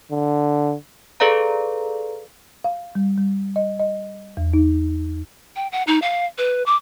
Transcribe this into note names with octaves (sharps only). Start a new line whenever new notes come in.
D3
G#4 A4 B4 D5 F5 A#5
F5
G3
G3
D#5
D#5
E2
D#4
G5
F#5
D#4
F5
B4
D6